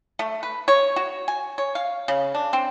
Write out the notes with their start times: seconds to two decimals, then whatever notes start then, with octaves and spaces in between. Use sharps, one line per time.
0.19 A3
0.43 B4
0.68 C#5
0.96 F#4
1.28 G#5
1.58 C#5
1.75 F5
2.08 C#3
2.35 D4
2.53 C4